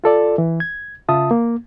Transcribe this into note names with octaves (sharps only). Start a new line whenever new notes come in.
F4 A4 D5
E3
G#6
C#3 F4 E5 A5 D#6
A#3